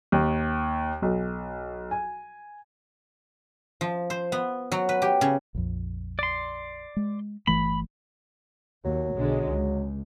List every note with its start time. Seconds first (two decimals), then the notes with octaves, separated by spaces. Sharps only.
0.12 D#2
1.02 B1
1.91 G#5
3.81 F3
4.10 C5
4.32 B3
4.72 F#3
4.89 B4
5.02 G4
5.21 C#3
5.55 A#1 F2
6.19 D5 C6
6.97 G#3
7.47 G1 E3 A3 B5
8.85 D#2 F#3
9.16 B1 D3 G#3
9.48 C#2